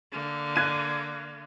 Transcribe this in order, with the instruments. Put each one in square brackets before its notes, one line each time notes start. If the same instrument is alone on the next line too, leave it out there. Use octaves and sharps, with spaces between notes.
[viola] D3 A#3
[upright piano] F#6 G#6 D#7